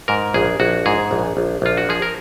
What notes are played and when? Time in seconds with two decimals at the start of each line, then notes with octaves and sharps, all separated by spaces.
0.08 G#2 A#4
0.34 A#1 G#4
0.60 A#1 F#4
0.86 G#2 G#4
1.11 A#1
1.37 A#1
1.62 A#1 F4
1.77 F#4
1.89 F3 G#4
2.02 A#4